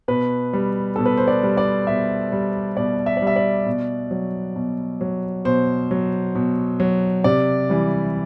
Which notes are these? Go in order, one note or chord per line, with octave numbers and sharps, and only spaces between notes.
B2 B4
G3
B2 A4
B4
C5
D5
G3
D5
B2 E5
G3
B2 D5
E5
D5
G3
E5
D5
B2
F#3
B2
F#3
B2 C5
F#3
B2
F#3
C3 D5
E3 G3